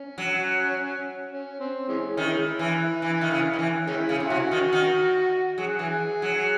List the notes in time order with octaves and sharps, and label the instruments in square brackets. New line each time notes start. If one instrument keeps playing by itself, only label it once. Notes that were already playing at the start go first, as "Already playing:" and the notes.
Already playing: [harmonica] C#4
[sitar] F#3
[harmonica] C#4
C4
E3 G#3 C#4
[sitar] D#3 [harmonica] G#3 C#4 E4
[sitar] E3
E3
D#3
C#3
D#3
E3
[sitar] D#3 [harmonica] G#3 C#4 E4
[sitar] C#3
C3
[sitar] C#3 [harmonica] C#4 F#4
[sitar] D#3
D#3
[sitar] F#3 [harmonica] G#4
[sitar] E3
F#3